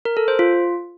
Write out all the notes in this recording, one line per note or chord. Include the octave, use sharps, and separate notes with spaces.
A#4
A4
C5
F4